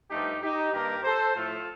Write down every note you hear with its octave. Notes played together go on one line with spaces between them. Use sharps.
G2 F3 A3 D#4 G4
D#4 G4
G2 D#3 A#3 G4 A#4
A4 C5
A2 F3 A3 F4 A4